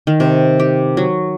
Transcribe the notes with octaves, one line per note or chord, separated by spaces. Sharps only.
D#3
C3
G4
F#3